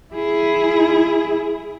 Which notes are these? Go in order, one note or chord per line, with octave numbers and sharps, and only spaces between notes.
E4 G#4